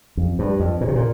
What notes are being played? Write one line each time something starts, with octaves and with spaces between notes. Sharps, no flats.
F2
G2
F2
A#2
C3
A#2